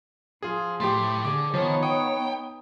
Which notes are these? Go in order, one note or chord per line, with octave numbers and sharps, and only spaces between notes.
F3 F4 G#4
A2 A3 G4 C6
D3 G#4 D6
D#3 F3 B3 D#4 C#5
G5 D#6